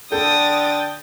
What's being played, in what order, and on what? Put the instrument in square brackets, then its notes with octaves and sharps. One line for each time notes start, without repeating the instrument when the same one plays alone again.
[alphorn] D3 [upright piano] A4 [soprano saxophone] G5 [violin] D#6 A6